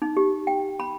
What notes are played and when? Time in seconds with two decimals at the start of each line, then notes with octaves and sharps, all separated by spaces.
0.02 D#4
0.17 G4
0.47 G5
0.80 B5